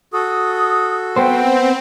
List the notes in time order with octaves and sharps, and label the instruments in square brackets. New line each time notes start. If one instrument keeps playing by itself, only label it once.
[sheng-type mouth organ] F#4 A4 [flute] D#6
[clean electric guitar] B3 C5 [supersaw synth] C4 [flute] G5